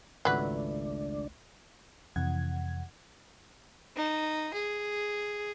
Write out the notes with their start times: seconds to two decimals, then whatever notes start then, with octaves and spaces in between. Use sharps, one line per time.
0.25 G#1 C#2 F#3 A3 D4 B4 D5
2.16 F2 C3 E3 F#5 G#6
3.97 D#4
4.53 G#4